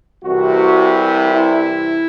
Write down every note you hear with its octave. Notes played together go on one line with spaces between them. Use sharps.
C2 C3 E3 F#4
E4